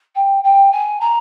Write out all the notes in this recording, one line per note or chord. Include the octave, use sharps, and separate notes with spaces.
G5
G5
G#5
A#5